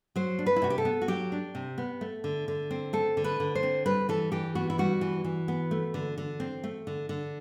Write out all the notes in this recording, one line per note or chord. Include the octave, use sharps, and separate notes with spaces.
F#3 C5
D4
B4
E4
C3 F#4
G4
A4
B3
F#4
F#3 G4
D4
C3
B3
A3
D3
D3
C4
A3 A4
D3
B4
D3
C5
C4
G3 B4
E3 A4
E3 G4
B3 F#4
E4
G3 F#4
E3
E3
B3
A3
D3
D3
C4
A3
D3
D3